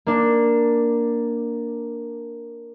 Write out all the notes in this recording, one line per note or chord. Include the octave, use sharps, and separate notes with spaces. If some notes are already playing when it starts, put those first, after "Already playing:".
A#3 D4